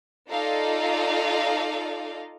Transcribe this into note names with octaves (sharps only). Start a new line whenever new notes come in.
D#4 F4 A4 D5 D#5 F5